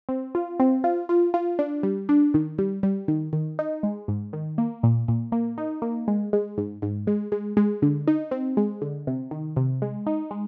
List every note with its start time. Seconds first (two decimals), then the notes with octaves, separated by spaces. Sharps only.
0.09 C4
0.35 F4
0.60 C4
0.84 F4
1.09 F4
1.34 F4
1.59 D4
1.83 G3
2.09 D4
2.34 D#3
2.59 G3
2.83 G3
3.08 D#3
3.33 D#3
3.59 D#4
3.83 G#3
4.08 G#2
4.33 D#3
4.58 A#3
4.83 A#2
5.08 A#2
5.32 A#3
5.58 D#4
5.82 A#3
6.08 G#3
6.33 G#3
6.58 G#2
6.82 G#2
7.07 G#3
7.32 G#3
7.57 G#3
7.82 D3
8.07 D#4
8.31 C4
8.57 G#3
8.82 D3
9.07 C3
9.31 D#3
9.57 C3
9.82 G#3
10.06 D#4
10.31 G#3